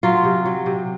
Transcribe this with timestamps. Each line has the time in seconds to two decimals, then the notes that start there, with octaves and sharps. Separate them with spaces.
0.03 F#3 F4
0.24 C3
0.46 F#3
0.66 C3